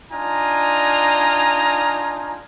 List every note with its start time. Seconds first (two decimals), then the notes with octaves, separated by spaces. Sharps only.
0.12 D4 D#4 F4 G#5 A#5